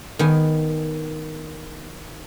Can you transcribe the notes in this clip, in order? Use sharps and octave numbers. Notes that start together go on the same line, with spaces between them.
D#3 B3 G#5